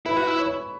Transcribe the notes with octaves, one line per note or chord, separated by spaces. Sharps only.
E4 B4
F#4
E4
C#5